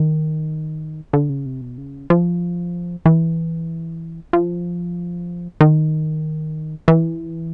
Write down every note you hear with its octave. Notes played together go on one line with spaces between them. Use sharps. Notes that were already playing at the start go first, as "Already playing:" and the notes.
Already playing: D#3
D3
C#3
C3
B2
C#3
F3
E3
F3
D#3
E3